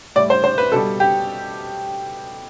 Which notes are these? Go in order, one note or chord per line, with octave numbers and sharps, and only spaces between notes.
A2 G3 D5
C5
C5
B4
B2 G3 A4
G4